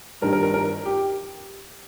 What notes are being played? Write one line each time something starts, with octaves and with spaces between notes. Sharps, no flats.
G2 D#3 G3 A#4
A#4
A#4
A#4
G4